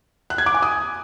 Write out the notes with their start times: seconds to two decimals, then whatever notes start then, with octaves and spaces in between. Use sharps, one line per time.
0.30 F#6
0.38 G#6
0.46 D6
0.54 G#5
0.62 D#6